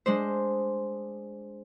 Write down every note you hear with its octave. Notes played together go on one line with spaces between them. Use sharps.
G#3 D4 C5